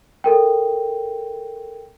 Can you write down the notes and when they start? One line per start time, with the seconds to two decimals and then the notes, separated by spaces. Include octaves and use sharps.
0.24 A4 A#4 G5